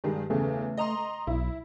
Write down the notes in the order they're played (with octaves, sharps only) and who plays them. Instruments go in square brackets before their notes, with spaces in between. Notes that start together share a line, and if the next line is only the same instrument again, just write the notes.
[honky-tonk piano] G2 D#3 G#3 [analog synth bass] G3
[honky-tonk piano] E2 C#3 [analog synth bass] A3
[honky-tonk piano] D#5 A#5 C6
[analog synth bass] B1 [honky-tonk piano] E4